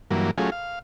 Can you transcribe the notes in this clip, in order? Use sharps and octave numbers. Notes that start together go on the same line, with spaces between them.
G2 E3 F#3 A#3
F#3 A3 C#4 F4 G#4
F5